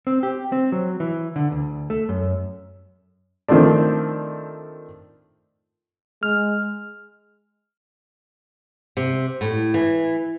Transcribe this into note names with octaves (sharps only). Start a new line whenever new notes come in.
C4
G4
C4
F#3
E3
D3
D2
A3
F#2
D#3 F3 A3 C4 D4
G#3 F6
C3
A2
E3